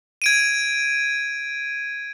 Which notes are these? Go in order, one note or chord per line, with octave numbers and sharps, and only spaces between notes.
G#6 D7 D#7